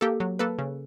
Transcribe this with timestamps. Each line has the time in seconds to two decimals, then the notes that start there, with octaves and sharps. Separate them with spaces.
0.01 A#3 G4 A4
0.20 F#3
0.39 A#3 A4 B4
0.58 C#3